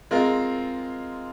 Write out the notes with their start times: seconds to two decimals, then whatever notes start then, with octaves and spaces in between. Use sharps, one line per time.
0.11 G#3 C4 F4 A#4